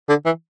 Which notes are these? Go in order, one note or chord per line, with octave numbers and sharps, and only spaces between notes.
D3
E3